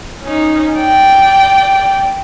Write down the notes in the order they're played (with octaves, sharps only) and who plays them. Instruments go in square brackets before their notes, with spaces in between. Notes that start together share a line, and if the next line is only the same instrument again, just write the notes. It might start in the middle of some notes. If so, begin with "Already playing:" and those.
[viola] C#4 D#4
D5 G5